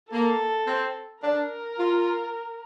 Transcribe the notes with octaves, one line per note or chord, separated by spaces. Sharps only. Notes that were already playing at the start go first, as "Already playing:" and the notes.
A#3 A4
C4
D4 A#4
F4